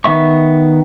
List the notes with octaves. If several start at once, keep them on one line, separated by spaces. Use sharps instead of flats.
D#3 B3 E5 C#6